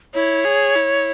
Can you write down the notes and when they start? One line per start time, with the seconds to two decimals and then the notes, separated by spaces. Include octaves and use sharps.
0.14 E4 C#5
0.45 G#4
0.75 E4